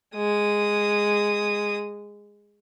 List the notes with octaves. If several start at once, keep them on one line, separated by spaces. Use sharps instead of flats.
G#3 D#6